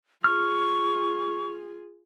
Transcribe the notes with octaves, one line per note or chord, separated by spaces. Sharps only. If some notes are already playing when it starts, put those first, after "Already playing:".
F4 G#4 C#6 F6